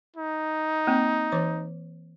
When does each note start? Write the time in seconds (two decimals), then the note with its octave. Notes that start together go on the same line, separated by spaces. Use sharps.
0.16 D#4
0.87 A#3 C4
1.32 E3 C#5 D6